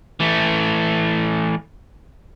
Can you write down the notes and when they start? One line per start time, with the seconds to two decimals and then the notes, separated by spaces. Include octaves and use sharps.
0.20 E3 A3